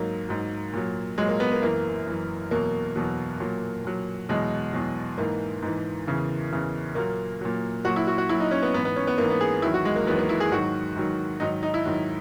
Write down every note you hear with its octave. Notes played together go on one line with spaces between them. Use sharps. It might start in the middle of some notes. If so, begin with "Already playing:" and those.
Already playing: G#2 F#3 A#3
G#2 F#3
A#2 F#3
A#2 F#3 G#3
A#3
B3
A#3
F#2 E3 A#3
F#2 E3
E2 B2 F#3 A#3
E2 B2 F#3
A#2 F#3
A#2 F#3
E2 B2 F#3 G#3
E2 B2 F#3
G#2 E3 A#3
G#2 E3
E2 C#3 E3
E2 C#3 E3
A#2 F#3 A#3
A#2 F#3
A#2 F#3 F#4
E4
F#4
F#4
A#2 F#3 E4
D#4
C#4
B3
G#2 E3 B3
B3
C#4
B3
G#2 E3 A#3
B3
G#4
E2 D#3 F#3 E4
F#4
G#3
A#3
E2 D#3 F#3 B3
A#3
E4
G#4
G#2 D#3 F#3 F#4
G#2 D#3 F#3
G#2 D#3 F#3 D#4
D#4
E4
G#2 D#3 F#3